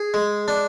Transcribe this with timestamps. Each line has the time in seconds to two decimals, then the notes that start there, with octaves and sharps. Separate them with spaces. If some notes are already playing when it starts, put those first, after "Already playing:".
Already playing: G#4
0.14 G#3
0.48 D4